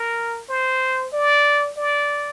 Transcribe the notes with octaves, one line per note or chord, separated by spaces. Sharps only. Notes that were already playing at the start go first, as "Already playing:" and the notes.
Already playing: A#4
C5
D5
D5